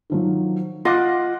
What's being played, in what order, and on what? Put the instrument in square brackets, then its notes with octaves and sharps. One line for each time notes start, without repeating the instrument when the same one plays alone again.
[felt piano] D#3 F3 F#3
[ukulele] F4 D#5 F5 [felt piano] F#5 D6 F#6